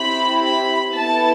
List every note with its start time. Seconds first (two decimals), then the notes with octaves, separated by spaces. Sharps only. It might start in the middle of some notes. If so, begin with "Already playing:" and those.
Already playing: C4 E4 G4 B5
0.42 B5
0.93 B3 E4 A4 A5